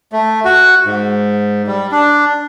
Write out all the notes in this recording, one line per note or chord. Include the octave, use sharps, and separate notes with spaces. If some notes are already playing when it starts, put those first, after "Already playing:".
A3
F#4
G#2
G3
D4